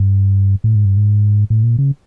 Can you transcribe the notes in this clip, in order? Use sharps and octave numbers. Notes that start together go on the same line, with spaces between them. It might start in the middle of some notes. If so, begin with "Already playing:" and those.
Already playing: G2
A2
G#2
G2
G#2
A2
A#2
C#3